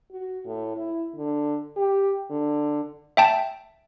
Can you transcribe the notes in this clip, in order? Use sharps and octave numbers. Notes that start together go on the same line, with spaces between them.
F#4
A2
E4
D3
G4
D3
E5 G5 A5